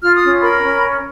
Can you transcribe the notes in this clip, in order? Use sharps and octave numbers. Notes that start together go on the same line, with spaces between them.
F4 F6
D#6
C#4
A#4 B5
C#4